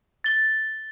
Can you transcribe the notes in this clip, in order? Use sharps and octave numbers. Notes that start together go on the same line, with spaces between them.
A6 G7